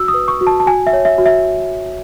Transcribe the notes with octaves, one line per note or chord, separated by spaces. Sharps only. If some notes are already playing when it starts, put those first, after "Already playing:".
Already playing: F#4 E6
D#6
B4
C#6
F#4
A5
A5
F#4 G#5
E5
C#5
E5
F#4
E5